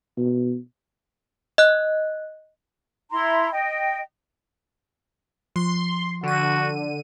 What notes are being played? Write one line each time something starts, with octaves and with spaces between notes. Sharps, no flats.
B2
D#5 F#6
E4 A#5 C6
D#5 G5
F3 C6
D3 F#4 D#7